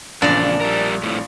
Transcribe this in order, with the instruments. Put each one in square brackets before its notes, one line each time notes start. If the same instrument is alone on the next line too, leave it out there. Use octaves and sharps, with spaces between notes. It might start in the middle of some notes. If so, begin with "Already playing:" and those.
[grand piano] A#1 [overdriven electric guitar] E2 C#3 [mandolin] D4 A#5
[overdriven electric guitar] G3 A#4
F2 A2